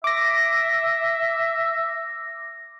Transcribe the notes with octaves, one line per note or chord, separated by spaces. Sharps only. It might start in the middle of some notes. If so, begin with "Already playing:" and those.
E5 D6 A#6